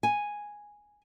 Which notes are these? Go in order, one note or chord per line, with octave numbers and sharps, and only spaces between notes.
G#5